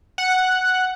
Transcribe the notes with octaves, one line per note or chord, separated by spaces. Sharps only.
F#5